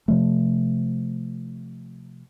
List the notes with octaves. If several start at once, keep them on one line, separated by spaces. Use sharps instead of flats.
C3 F3 A3